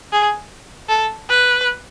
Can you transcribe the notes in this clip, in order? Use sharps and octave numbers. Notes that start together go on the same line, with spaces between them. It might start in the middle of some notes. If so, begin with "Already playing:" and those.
G#4
A4
B4